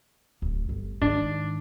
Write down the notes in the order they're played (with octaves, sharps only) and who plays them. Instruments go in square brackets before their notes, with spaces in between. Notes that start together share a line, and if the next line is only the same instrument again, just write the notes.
[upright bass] D1
G1
[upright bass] G#2 D#3 [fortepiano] D4